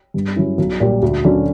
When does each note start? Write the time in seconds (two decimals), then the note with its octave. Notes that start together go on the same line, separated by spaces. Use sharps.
0.14 G2
0.36 F#3 C#4 E4
0.58 B1
0.80 A#2 G3
1.02 D2
1.24 D3 F#3 C#4